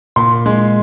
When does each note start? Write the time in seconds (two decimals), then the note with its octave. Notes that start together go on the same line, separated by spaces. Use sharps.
0.16 A#2 C6
0.46 G#3